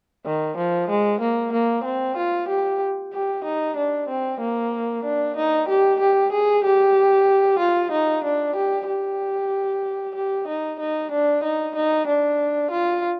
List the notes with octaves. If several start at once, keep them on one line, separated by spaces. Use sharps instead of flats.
D#3
F3
G#3
A#3
A#3
C4
F4
G4
G4
D#4
D4
C4
A#3
D4
D#4
G4
G4
G#4
G4
F4
D#4
D4
G4
G4
G4
D#4
D#4
D4
D#4
D#4
D4
F4